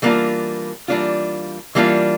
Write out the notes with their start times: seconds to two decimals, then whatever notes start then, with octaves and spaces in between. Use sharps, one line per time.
0.02 E3 G3 A#3 D4 F4
0.88 E3 G3 A#3 D4 F4
1.75 E3 G3 A#3 D4 F4